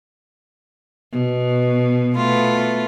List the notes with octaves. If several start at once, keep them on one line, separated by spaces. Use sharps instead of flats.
B2
A3 B3 F4